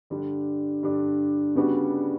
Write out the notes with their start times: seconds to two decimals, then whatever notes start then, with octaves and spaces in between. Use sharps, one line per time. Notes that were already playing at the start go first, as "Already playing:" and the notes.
0.10 G2 D3 G3 D4
0.83 G2 D3 G3 D4
1.55 C#3 G3 B3 D4 F#4